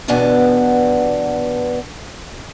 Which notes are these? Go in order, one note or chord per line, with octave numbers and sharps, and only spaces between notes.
E2 G2 B2 B3 D4 G#5